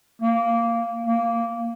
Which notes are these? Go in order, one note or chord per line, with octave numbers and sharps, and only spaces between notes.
A#3
A#3